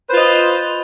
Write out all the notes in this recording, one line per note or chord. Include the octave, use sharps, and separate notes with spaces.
F4 B4 C5 D#5